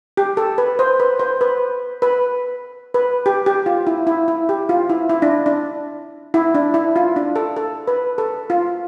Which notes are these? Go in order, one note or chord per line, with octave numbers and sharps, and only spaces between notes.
G4
A4
B4
C5
B4
C5
B4
B4
B4
G4
G4
F4
E4
E4
E4
G4
F4
E4
E4
D4
D4
E4
D4
E4
F4
D4
A4
A4
B4
A4
F4